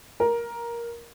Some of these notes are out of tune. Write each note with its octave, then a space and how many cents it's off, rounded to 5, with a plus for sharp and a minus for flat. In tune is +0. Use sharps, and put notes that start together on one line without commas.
A#4 +10